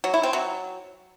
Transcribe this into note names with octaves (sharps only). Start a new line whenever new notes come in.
F#3
E4
C4
F#3